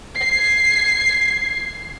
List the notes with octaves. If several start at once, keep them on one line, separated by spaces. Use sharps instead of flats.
G#6 C7